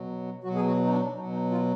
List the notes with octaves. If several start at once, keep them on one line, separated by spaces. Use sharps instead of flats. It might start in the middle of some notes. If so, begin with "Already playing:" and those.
Already playing: B2 F#3
B2 F#3 F#4
G#4
F#4
D#4
D4
D4
B2 F#3 D#4
D#4
F4